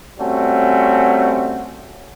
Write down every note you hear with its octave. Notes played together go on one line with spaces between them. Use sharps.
G3 A3 C4 C#4 F#4